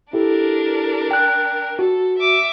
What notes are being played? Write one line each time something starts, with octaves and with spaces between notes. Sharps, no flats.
D4 E4 G4 A4 A#4
G5 F#6
F#4 A4
E5 D6